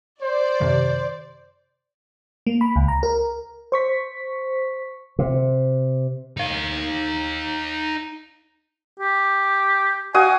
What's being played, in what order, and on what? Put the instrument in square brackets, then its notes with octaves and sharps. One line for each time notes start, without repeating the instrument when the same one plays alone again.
[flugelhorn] C5 [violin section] D5
[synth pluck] F#2 C3 D#3
[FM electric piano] A#3
B5
C#2
A#5
A#4
C5 C#6 B6
[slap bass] C3
[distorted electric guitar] D#4 F5
[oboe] G4
[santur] F#4 F5 D#6 [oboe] G#5